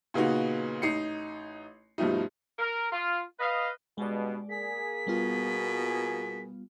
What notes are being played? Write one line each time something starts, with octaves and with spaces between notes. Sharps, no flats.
A#2 C#3 B3 D#4 F#4
A1 D#4 C7 C#7
G2 B2 F3 A3 D#4
A#4
F4
B4 D#5 F5
G2 B2 G#3 D5
A#3 G#4 B6
B2 G3 B3 F4